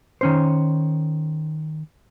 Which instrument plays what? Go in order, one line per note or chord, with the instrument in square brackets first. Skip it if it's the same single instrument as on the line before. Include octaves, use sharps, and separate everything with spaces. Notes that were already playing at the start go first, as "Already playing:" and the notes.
[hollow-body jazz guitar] D#3 C#4 C5